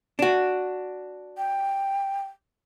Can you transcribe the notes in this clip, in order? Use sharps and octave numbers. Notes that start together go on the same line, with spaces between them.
D4 F#4
G5